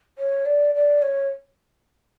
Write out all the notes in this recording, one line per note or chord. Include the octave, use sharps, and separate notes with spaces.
C#5
D5
D5
C#5